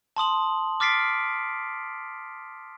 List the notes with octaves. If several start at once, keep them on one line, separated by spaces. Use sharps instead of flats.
A5 C6 D#6 F#7
D6 F6 A6 B6 C7 D7